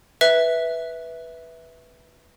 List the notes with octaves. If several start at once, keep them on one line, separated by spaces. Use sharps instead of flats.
B4 E5